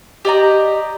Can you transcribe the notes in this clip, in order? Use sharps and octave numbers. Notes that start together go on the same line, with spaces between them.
G4 D5 D#5 A#5